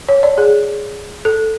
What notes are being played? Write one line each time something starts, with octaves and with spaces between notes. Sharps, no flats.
C#5
D5
G#4
A4